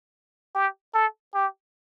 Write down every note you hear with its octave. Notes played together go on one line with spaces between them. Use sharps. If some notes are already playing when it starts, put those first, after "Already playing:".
G4
A4
G4